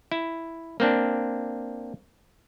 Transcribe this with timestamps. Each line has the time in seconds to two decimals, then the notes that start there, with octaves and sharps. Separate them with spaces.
0.12 E4
0.80 A#3 C4 D4